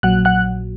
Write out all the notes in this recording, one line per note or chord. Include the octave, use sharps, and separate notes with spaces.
A#1 A#2 F#3 F#5 F#6
F#5 F#6